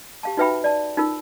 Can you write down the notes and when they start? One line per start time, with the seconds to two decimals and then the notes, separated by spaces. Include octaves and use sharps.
0.23 G4 F5 A5
0.37 D#4 F#4 B4 E5 G5 B5
0.64 D5 A5
0.97 D#4 F4 A#4